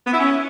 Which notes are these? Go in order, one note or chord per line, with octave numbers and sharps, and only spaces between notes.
B3
E4
C#4